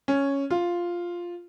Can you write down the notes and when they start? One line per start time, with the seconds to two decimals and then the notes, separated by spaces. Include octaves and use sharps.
0.08 C#4
0.50 F4